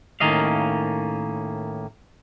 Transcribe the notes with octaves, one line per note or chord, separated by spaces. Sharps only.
A2 D#3 A#3 C#4 D#5 F5